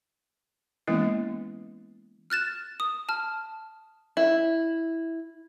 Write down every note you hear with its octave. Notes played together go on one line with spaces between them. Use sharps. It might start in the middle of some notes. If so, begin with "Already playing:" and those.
E3 G#3 A#3 B3 C#4 E4
F6 F#6 A6 E7
D#6
A5 F6
E4